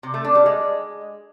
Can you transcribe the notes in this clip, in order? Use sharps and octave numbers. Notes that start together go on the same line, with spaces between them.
C3
A3
D4
G3
G#3